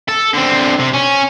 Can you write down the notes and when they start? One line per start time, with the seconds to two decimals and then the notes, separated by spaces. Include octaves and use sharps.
0.08 A4
0.34 D3 C4
0.79 C3
0.93 C#4